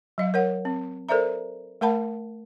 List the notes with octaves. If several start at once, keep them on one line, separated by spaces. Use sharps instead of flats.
F#3 D#5 F5
A#4 C#5 F#5
C4
A4 A#4 C5 D5 E5 A#5
A3 A#4 F#5 A5 B5